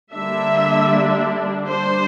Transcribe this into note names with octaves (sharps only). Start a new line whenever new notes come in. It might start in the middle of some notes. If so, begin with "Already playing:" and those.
D3 G3 A#3 D4 E5
G3 D4 C5